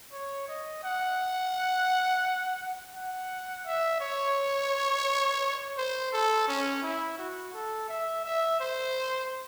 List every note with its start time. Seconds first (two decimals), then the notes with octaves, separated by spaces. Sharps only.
0.12 C#5
0.48 D#5
0.83 F#5
2.95 F#5
3.66 E5
4.01 C#5
5.78 C5
6.13 A4
6.48 C#4
6.83 E4
7.18 F#4
7.53 A4
7.89 E5
8.25 E5
8.60 C5